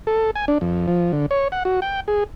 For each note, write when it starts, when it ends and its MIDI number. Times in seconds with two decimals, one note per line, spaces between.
0.07 0.31 69
0.35 0.45 80
0.48 0.58 62
0.61 0.87 41
0.88 1.12 53
1.12 1.26 50
1.31 1.48 73
1.52 1.63 78
1.65 1.80 66
1.82 2.00 79
2.08 2.24 68